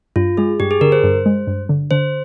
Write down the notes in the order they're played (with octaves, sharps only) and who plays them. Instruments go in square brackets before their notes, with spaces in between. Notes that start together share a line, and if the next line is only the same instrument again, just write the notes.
[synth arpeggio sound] G2 [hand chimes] F4
[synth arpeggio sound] G#3 [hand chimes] G#4
[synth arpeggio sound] G2 [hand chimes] G4
[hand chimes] G#4
[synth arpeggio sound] D3 [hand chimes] A#4
[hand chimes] C5
[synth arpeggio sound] G2
G#3
G2
D3
[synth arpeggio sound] D3 [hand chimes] C5